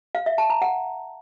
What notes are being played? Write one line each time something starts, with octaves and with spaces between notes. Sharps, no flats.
F5
E5
A5
A#5
F#5